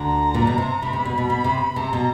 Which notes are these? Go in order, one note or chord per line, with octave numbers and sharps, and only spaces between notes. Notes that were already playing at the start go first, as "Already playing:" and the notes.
Already playing: D2 D3 A#5
A#2
B2
C3
C3 B5
C3
B2
B2
B2
C3
C3 A#5
B2